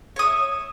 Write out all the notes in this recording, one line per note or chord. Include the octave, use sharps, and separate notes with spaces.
C#5 E5 D#6